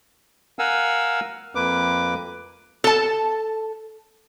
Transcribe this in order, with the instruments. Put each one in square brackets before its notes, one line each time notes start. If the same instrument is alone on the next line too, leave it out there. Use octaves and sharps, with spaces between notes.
[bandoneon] A#4 F5 F#5 G#5 E6
F2 A#3 B4 D6
[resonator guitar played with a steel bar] A4 A5